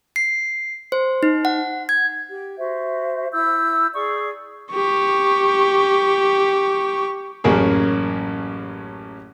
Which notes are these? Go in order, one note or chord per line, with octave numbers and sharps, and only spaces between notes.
C7
C5
D#4
F#5
G#6
G4
F#4 C5 E5
E4 E6 G6
G#4 D5 C#6 D#6
G4 C#6
A1 F#2 A#3 G#4